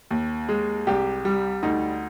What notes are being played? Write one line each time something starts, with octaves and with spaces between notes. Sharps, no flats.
D#2
G#3
C2 G4
G3
D2 D#4